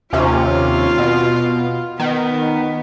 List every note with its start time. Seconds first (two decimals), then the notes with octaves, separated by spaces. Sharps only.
0.13 D#2 C3 C#4 F4
0.98 B2
2.00 D#3 B3